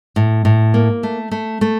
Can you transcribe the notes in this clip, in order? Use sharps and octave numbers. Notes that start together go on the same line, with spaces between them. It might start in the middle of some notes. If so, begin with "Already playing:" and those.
A2
A2
A#3
A3
A3
A3